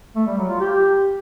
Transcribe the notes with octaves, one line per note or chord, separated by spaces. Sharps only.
A3
G3
F#3
F4
G4